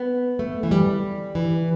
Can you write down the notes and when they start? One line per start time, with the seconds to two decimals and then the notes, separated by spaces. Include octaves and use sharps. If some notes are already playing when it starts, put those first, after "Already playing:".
Already playing: B3
0.39 A3
0.63 E3
0.71 G3
1.35 E3